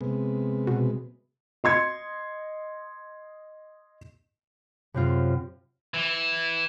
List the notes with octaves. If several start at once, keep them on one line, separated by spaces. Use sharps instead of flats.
C3 G#3 B3
B2
D#5 C6 G#6 C#7
F#2 C3 C4 F4
E3